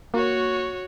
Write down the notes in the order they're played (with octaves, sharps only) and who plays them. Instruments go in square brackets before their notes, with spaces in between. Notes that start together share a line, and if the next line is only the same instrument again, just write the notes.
[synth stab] A#3 [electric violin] F#4 C#5